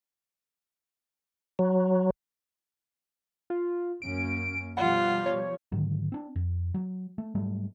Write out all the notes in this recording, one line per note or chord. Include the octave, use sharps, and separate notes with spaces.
F#3
F4
F#2 A#3 C#4 D7
B2 F3 G3 F4 F#5
C#5
G#2 D3 D#3 F#3
C4 D4
F2
F#3
A3
G#2 F#3 G3 A3